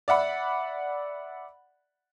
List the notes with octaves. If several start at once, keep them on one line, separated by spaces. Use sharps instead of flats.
D5 E5 F#5 B5